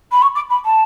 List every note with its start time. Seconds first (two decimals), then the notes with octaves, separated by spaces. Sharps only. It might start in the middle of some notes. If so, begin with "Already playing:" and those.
0.12 B5
0.22 C#6
0.35 D6
0.50 B5
0.65 A5